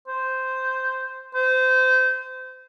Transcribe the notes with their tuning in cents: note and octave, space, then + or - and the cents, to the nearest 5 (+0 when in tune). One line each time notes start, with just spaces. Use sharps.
C5 -5
C5 -25